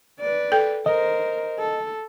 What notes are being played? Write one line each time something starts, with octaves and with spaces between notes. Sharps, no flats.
B4 D5
A4 G5
A#4 C5 D#5
A4